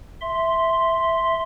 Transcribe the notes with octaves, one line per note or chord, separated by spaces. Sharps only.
E5 C6